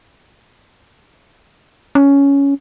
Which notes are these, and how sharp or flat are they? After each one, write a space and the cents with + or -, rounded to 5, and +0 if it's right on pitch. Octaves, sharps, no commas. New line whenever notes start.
C#4 +10